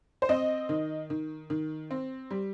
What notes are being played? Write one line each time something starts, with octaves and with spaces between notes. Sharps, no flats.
C5
C4 D#5
D#3
D#3
D#3
C4
G3